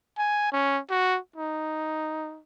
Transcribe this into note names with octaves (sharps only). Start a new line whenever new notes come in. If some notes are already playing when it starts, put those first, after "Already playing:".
G#5
C#4
F#4
D#4